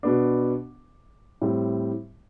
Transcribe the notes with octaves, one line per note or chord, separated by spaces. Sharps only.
B2 B3 D4
A2 G3 C4